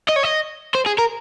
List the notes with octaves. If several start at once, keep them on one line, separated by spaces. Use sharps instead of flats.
D#5
C#5
D#5
C5
G#4
A#4